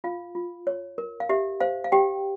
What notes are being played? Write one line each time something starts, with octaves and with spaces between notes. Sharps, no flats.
F4 F5
F4
C#5
A#4
F5
G4 E5
C5 F5
F5
G4 G5